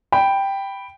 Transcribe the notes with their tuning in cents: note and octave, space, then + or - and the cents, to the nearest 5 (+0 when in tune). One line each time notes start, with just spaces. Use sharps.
G5 +0 B5 +0